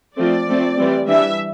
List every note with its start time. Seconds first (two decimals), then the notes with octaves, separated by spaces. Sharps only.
0.17 F3 A3 C4 D5
0.46 F3 A3 C4
0.77 E3 G3 C4
1.07 E3 G3 D4 E5